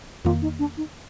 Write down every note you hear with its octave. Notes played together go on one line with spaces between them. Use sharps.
F2 D#3 A#3 F4
D#4
D4
D#4